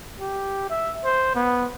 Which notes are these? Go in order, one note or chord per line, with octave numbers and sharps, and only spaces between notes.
G4
E5
C5
B3